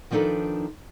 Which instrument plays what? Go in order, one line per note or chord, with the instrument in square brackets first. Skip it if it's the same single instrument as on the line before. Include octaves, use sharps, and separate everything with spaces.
[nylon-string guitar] D#3 F3 D4 D#4 A4 B4